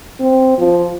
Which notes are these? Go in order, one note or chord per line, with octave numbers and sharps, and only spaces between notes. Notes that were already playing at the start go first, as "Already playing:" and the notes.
C4
F3